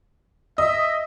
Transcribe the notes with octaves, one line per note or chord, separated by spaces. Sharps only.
D#5 E5